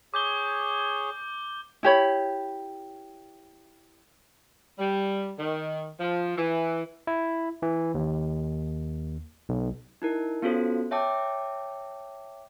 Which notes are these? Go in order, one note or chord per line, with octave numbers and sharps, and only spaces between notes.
G#4 C#5 D6 G6 G7
E4 G4 C#5 B5
G3
D#3
F3
E3
E4
E3
D#2
B1
D#4 E4 A#4
B3 C#4 F4 F#4 A4 C5
C#5 E5 G5 A5 D6